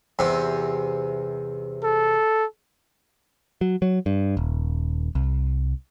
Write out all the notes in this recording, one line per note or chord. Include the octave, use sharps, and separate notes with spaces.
E2 C3
A4
F#3
F#3
G2
D#1
C2